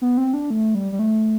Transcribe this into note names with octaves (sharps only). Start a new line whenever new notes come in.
B3
C4
D4
A3
G3
G3
A3